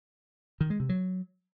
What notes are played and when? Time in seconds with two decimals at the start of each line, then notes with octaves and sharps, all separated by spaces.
0.61 D#3
0.70 G#3
0.80 C3
0.89 F#3